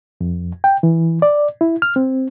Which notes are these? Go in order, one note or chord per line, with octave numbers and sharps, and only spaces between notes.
F2
G5
E3
D5
E4
F6
C4